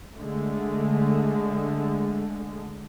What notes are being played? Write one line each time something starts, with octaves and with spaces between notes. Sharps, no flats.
D3 G#3 A3